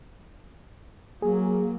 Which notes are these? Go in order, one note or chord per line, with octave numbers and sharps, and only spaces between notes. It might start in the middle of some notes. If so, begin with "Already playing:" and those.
F#3 A#3 G#4